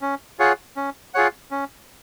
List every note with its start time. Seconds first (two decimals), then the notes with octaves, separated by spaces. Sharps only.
0.02 C#4
0.39 F4 G#4 C#5 F#5
0.77 C#4
1.14 F4 G#4 C#5 F#5
1.51 C#4